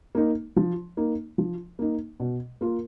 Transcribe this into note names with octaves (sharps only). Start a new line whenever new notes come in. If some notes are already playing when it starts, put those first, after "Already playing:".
A#3 D#4
F3
A#3 D#4
F3
A#3 D#4
B2
A#3 F4 A#4